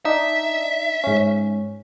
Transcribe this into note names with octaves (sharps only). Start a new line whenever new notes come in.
D4 D#4 E5
G#2 C#4